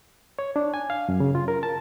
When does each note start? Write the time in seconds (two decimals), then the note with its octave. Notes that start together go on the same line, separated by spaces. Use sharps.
0.39 C#5
0.56 D4
0.74 G#5
0.90 F5
1.09 F#2
1.20 C#3
1.35 F4
1.48 A#4
1.63 A5